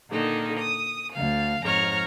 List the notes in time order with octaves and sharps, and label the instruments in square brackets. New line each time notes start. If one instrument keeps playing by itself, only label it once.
[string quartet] A#2 D3 D#3 D#4
D#6
D2 F5
F2 G#2 C#5 A#5 F6